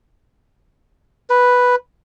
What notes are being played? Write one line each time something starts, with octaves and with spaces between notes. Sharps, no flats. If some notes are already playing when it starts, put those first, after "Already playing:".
B4